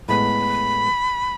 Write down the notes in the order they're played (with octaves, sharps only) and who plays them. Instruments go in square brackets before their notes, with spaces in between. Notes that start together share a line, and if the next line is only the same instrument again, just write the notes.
[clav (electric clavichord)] A2 G#3 B3 [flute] B5